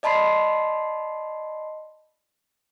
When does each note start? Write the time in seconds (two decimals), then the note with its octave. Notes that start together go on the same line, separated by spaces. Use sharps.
0.03 D5 D#5 A5 B5 C6 C7